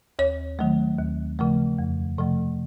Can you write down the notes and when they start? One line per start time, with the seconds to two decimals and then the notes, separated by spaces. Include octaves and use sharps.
0.19 D#2 C#5
0.59 D#3 F#3 A3
0.98 D#2
1.39 C#3 F3 A3
1.79 F2
2.18 C3 F3 A3